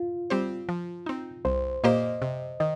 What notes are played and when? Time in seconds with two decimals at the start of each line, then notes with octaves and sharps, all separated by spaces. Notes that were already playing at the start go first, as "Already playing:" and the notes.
Already playing: F4
0.30 G3 C4 G4 C5
0.69 F3
1.06 C4 D#4
1.45 C2 C5
1.84 A#2 A#3 G4 C5 D#5
2.22 C3
2.60 D#3 D#5